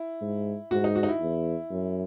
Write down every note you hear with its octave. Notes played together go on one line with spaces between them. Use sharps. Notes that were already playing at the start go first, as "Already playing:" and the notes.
Already playing: E4
G#2
G#2 F#4
D#4
F#4
D#4
E4
E2
F#2